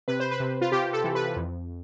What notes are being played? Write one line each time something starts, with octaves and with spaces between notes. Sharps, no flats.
C3 B4
C5
B4
C3
F4
C3 G4
A4
E3
B4
F2